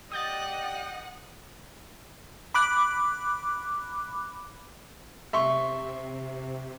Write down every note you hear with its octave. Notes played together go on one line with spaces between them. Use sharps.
G4 D5 D#5 F#5 G5 D#6 G6 A6
B5 D6 F#6
C3 E5 C6 C#6